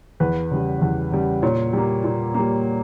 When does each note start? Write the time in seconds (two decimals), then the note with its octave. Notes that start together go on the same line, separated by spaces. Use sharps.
0.20 E2 B4
0.51 C#3 G3
0.81 E2
1.12 C#3 G3
1.43 A#2 C#5
1.73 G3 A#3
2.04 A#2
2.34 G3 A#3